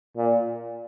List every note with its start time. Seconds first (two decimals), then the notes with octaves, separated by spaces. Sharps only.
0.17 A#2